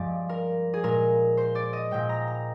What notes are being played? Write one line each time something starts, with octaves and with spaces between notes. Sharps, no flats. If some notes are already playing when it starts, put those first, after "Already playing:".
Already playing: G2 F3 G#3 D5
A#4
G#4
A#2 G#3 A#4
C5
D5
D#5
A#2 G#3 G5
A#5
A#5